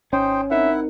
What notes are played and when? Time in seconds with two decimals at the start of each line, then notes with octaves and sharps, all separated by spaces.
0.13 G#1 C#4 D#4 C5 G5
0.51 C4 D#4 E4 A#4 E5 F#5